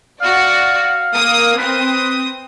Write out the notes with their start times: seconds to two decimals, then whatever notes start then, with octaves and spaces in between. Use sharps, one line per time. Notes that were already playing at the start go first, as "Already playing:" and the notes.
0.22 F#4 D5 F5
1.12 A#3 D#6
1.58 C4 B4 D#6